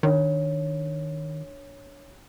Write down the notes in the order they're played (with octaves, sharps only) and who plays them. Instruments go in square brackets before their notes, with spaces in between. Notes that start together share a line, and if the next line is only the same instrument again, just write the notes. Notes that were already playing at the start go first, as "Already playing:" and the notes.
[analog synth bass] D#3 [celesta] D4 C#5